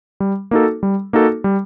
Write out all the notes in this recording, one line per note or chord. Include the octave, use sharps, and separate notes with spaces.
G3
A#3 D#4 F#4 A4
G3
A#3 D#4 F#4 A4
G3